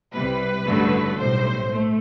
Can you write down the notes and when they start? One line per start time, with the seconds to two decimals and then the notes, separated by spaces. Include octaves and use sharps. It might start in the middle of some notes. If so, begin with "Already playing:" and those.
0.13 C2 C3 G3 B4
0.66 A1 G2 D3 F#3 A3
1.19 B1 A2 G3 C5
1.71 A3